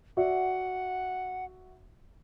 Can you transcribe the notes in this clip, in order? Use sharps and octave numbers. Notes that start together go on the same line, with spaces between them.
F#4 D5 E5 F#5